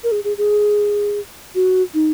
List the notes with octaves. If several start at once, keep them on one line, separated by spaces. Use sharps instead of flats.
A#4
G#4
G#4
G#4
F#4
D#4